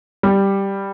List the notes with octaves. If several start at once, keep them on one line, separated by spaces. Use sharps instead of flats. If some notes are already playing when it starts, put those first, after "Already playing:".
G3